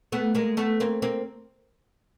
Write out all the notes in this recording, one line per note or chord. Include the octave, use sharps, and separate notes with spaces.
A3 B3
G#3 A#3
A3 B3
A#3 C4
A#3 C4